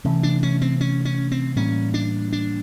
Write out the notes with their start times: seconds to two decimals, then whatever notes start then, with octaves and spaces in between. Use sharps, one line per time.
0.04 C3 E3 A3 C#4
0.23 D4
0.43 C#4
0.62 C4
0.81 C#4
1.05 C#4
1.32 C4
1.56 A2 E3 G3 A#3 C#4
1.94 D4
2.33 D4